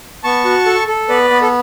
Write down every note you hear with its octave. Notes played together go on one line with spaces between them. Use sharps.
B3 A5 C#6
F#4
A4
A4
B3 B4 D5
B3
A4